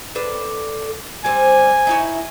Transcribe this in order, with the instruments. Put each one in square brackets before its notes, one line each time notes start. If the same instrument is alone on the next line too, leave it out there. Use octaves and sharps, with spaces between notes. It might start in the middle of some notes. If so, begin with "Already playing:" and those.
[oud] D4 A4 B4
[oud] G3 C4 [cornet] G#5
[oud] D#4 E4 C#5